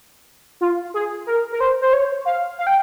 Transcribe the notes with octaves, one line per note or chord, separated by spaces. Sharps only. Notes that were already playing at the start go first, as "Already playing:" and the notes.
F4
G#4
A#4
A#4
C5
C5
C#5
F5
F5
G5